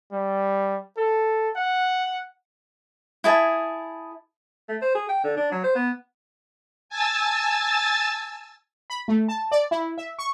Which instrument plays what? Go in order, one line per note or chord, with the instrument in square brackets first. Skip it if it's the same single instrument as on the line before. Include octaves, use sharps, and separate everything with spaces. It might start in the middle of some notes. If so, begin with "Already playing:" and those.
[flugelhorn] G3
A4
F#5
[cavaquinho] E4 G#4 A5
[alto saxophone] A3
C5
G#4
G5
D3
D4
F#3
C5
B3
[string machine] G#5 A5 E6 A6
[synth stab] B5
A3
A5
D5
E4
E5
C#6